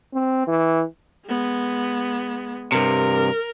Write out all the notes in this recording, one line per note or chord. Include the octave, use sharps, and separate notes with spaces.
C4
E3
G#3 B3
G2 C3 A#4